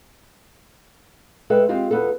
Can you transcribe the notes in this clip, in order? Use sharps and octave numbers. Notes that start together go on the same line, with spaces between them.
G#3 A4 B4 E5 G5
G#3 C4 F4 G4
E2 B3 F4 A4